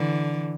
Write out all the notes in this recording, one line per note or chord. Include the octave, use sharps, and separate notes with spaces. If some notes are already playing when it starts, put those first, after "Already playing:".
Already playing: D3 E3